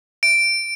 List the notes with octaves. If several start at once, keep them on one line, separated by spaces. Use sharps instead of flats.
D7